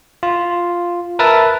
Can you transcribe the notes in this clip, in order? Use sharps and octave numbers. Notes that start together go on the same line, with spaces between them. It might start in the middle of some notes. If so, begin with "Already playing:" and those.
F4
A#4 B4 E5 A5